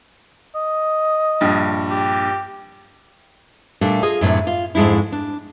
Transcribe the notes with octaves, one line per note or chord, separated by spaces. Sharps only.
D#5
A#1 G2
G4
A#2 G3 A3 D4
F4 G#4 D#5
F#2 A2 C3 D4
F4
F2 G#2 G#3 D4 E4
D4